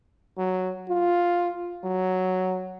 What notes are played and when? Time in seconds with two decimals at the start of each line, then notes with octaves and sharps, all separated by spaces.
0.38 F#3
0.89 F4
1.84 F#3